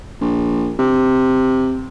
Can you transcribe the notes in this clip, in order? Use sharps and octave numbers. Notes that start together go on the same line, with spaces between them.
A#1
C3